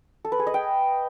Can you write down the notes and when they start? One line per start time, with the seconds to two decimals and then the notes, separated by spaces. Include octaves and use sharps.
0.25 A4
0.32 B4
0.39 G#4
0.47 D#5
0.54 G5